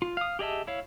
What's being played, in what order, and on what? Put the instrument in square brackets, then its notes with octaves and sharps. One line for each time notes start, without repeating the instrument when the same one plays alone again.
[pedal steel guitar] F4
F5 D#6
G4 G#4 D#5 E5 A5
E4 C#5 F5